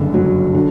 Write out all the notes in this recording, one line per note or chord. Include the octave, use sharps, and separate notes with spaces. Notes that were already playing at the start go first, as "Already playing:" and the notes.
Already playing: F#1 G2 D3
F#3
D3